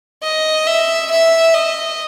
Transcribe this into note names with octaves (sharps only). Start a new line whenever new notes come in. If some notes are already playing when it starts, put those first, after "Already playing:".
D#5
E5
E5
D#5